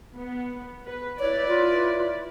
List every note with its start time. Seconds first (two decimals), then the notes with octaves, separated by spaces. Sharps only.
0.18 B3
0.87 B4
1.19 E4 B4 C#5 D5
1.49 F4